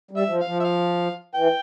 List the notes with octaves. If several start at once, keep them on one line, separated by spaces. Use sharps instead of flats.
G3
E5
F3
F5
F3
E5
F5
E3 G5